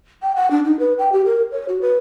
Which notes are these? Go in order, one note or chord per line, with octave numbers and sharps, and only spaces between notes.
G5
F#5
D4
D#4
B4
G5
G4
A#4
C#5
F#4
B4